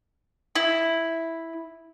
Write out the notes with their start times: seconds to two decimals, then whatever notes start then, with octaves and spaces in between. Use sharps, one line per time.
0.55 E4